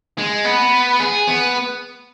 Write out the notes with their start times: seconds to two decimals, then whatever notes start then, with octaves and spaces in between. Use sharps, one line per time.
0.18 G#3
0.45 B3
1.00 G#4
1.27 B3